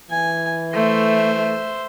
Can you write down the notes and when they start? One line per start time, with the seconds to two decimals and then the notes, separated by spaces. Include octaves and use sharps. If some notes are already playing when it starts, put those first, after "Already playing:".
0.10 E3 G#5
0.73 A3 C5 E5